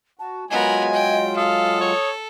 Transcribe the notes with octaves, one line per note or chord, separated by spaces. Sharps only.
F#4 A5
F#3 G#3 B3 F4 A#4 D#5 G#5
G5
A4 F5 D#6
C#5